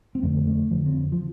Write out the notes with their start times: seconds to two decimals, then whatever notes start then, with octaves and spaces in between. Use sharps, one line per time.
0.15 C4
0.23 F2 D3 A3
0.47 A3
0.70 F2 D3 F3
0.86 C4
1.12 F3